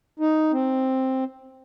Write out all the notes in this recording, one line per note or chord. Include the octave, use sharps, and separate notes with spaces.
D#4
C4